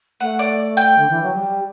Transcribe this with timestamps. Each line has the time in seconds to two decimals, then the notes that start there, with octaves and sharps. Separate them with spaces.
0.20 A3 F#5
0.39 D5
0.77 G5
0.98 D3
1.10 E3
1.22 F#3
1.34 G3